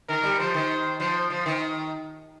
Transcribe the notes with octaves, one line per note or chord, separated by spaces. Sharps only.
D#3 A#4
G3
F3 C5
D#3
F3 C5
F3 C5
D#3